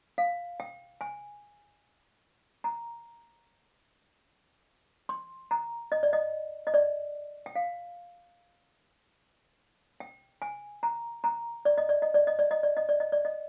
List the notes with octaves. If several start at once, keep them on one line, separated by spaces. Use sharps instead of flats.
F5
G5
G#5
A#5
C6
A#5
D#5
D5
D#5
D#5
D5
G5
F5
G5
G#5
A#5
A#5
D5
D#5
D5
D#5
D5
D#5
D5
D#5
D5
D#5
D5
D#5
D5
D#5